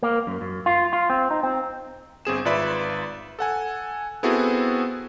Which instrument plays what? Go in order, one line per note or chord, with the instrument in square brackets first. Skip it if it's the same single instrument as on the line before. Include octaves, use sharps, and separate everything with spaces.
[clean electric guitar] A#3
F#2
F#2
F4
F4
C4
D#4
C4
[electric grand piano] G1 C4 G#4 E7
G#1 F4 B4 D5 E5 B5
A4 F#5 G#5
B3 C4 E4 F#4 G#4 A4